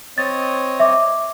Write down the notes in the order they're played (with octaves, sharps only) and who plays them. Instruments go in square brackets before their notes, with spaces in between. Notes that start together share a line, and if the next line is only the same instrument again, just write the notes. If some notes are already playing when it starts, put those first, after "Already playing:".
[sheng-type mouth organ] C4 C#5 D#5 [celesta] A6
[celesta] E5 D6